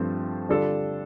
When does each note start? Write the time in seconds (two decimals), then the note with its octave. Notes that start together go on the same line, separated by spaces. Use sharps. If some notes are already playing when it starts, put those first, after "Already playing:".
Already playing: G2 F3 A3 C4
0.49 D3 G3 D4 F4 A4